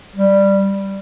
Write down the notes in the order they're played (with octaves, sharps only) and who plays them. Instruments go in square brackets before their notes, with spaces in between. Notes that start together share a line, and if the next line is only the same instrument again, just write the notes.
[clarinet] G3